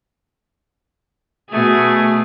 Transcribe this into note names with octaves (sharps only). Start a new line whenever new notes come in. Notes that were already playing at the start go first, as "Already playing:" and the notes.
B2 A3 G#4